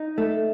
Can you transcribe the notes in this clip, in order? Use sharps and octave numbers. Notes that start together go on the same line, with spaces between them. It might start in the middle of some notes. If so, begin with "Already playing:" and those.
Already playing: D#4
A3